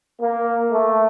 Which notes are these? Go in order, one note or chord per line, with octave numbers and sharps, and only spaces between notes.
A#3
A3